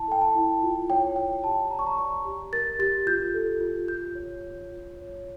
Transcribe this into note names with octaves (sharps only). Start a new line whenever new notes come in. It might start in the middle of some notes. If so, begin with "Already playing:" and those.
Already playing: E4 A5
A4 G5
A5
E4
F4
C#5 G5
C#5 G5
G4 A5
D5 A#5
C#6
A#5
D5 C#6
G4
A#4 A6
G4 A6
F4 G6
A4
F4
F4 G6
C#5
C#5
F4
C#5